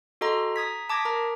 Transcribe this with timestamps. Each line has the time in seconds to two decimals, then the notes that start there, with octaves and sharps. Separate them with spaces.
0.21 F#4 A4 D#5 A#5 C6
0.56 A#5 D#6 G#6 B6
0.89 A5 D6 D#6 G#6 A#6 B6
1.05 A#4 A#5 D6